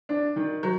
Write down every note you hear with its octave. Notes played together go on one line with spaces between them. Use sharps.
D4
D#3
F#3